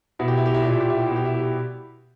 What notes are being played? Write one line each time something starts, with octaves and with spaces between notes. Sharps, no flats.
B2 E4
G4
E4
G4
E4
A#2 G4
E4
G4
E4
G4
B2 E4
G4
E4
G4
E4